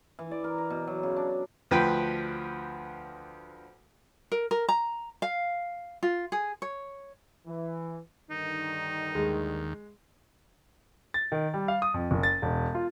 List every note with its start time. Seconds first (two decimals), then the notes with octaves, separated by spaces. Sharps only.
0.19 E3
0.31 D5
0.44 A#4
0.58 A#5
0.70 B2
0.87 F#3
1.03 C#3
1.16 D4
1.71 D2 F3 B4 G5
4.32 A#4
4.51 A#4
4.68 A#5
5.22 F5
6.03 F4
6.32 G#4
6.62 C#5
7.47 E3
8.31 G2 D3 D#3 D#4
9.15 D#2 G#3
11.14 A6
11.32 D#3
11.54 G3
11.68 F5
11.82 D#6
11.94 F2
12.11 F#1
12.23 A6
12.42 E1
12.75 F4